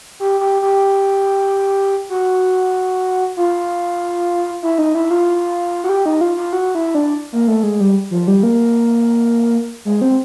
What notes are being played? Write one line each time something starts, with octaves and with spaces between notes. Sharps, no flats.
G4
G4
G4
F#4
F4
E4
D#4
E4
F4
F#4
G4
D#4
F4
F4
F#4
E4
D4
A#3
A3
G#3
G3
F3
G3
A#3
G#3
C4